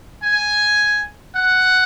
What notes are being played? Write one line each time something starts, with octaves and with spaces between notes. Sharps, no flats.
G#5
F#5